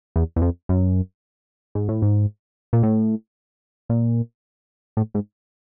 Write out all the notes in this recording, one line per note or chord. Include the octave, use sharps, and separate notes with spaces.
E2
E2
F2
F#2
G#2
A2
G#2
A#2
A2
A#2
A2
G#2